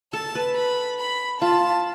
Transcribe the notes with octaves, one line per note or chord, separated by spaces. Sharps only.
A4 A5
B4
B5
B5
F4 A5